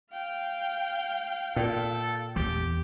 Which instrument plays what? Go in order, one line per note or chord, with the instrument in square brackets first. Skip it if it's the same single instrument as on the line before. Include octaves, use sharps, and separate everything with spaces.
[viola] F5 G5
[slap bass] A#2 [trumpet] A4
[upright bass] E2 [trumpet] G4